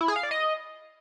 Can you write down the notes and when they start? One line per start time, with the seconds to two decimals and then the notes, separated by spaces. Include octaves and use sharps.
0.01 E4
0.08 G#4
0.16 F5
0.23 D5
0.31 D#5